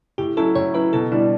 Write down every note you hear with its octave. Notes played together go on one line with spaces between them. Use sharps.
A2 G4
F#3 C#4 E4 A4
A2 C#5
F#3 C#4 E4 B4
B2 A4
G3 D4 E4